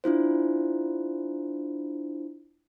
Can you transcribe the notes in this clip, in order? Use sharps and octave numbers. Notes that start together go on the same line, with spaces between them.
D4 E4 F4 C5